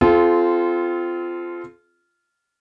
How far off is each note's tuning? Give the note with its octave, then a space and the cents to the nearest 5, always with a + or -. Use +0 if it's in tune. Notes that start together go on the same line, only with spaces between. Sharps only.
C4 -20 F4 -10 A4 -40